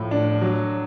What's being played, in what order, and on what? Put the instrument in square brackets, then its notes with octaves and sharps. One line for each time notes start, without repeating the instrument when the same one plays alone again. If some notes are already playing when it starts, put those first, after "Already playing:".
Already playing: [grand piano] A2 F3
D4
F#3